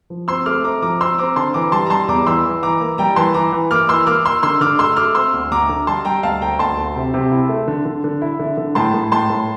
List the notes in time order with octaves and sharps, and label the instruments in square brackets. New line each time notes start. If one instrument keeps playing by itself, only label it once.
[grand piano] F3
[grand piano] C4 [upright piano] C6 E6
[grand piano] A3 [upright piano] D6 F6
[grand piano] C4 [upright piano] A#5 D6
[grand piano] F3 [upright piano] A#5 D6
[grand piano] C4 [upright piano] C6 E6
[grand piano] C4 [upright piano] A#5 D6
[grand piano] D3 [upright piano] A5 C6
[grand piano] E3 [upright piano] A#5 D6
[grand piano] G3 [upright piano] A5 C6
[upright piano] A#5
[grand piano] G3 [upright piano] A5 C6
[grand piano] E2 [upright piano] A#5 D6
[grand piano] E3 [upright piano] C6 E6
[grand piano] E3
[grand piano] E3 [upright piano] A#5 D6
[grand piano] A#3
[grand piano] G3 [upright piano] G5 A#5
[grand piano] E3 [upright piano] A5 C6
[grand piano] E3 [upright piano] A#5 D6
[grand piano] E3
[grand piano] A#3 [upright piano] D6 F6
[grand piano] E3 [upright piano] C6 E6
[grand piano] A#3 [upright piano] D6 F6
[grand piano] A#3 [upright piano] C6 E6
[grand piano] D3 [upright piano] C6 E6
[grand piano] D3 [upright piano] D6 F6
[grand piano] A3 [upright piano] C6 E6
[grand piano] A3 [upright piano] D6 F6
[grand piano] C4 [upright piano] C6 E6
[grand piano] D2
[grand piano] D2 [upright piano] A#5 D6
[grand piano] D3
[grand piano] G3 [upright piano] A5 C6
[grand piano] G3 [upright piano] G5 A#5
[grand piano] D2 [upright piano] F5 A5
[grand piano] D2 [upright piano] G5 A#5
[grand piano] D2 [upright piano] A5 C6
[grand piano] D2
C3
C3
E4
A3
D3
D3
D3
E4
D3
D3
[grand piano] A2 [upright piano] A5 C6
[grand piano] A2
[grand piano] A2 [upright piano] A5 C6
[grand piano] A2